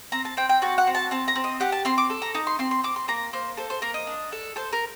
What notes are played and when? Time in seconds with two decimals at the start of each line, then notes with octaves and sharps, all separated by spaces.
0.12 C4 A#5
0.25 A5
0.37 C4 G5
0.49 G5
0.62 F#4 A5
0.78 F#5
0.87 C4
0.95 A5
1.11 C4 A5
1.28 A#5
1.36 C4
1.44 D#5
1.60 G4 F#5
1.72 A5
1.85 C4 C6
1.98 D6
2.10 A4
2.22 A#5
2.35 D#4 A#5
2.47 C6
2.59 C4 C6
2.71 C6
2.84 C4 D6
2.96 C6
3.08 A#3 A#5
3.33 A#3 C5
3.57 A4 C5
3.70 C5
3.82 A#3 A#4
3.94 D#5
4.07 D4
4.32 A4
4.56 A4 C5
4.73 A#4